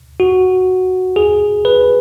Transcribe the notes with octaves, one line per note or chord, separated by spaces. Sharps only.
F#4
G#4
B4